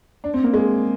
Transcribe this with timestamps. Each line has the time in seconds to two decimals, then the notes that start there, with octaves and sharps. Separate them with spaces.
0.24 D4
0.34 C4
0.44 A#3
0.54 G#3